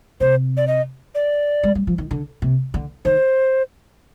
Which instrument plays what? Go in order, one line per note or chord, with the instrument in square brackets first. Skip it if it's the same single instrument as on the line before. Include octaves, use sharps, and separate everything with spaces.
[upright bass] C3 [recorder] C5
[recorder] D5
D#5
D5
[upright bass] G#3
G3
F3
D#3
D3
C3
D3
[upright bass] D#3 [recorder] C5